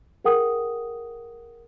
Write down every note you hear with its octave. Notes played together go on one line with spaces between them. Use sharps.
G#4 A#4 F#5 G5 D#6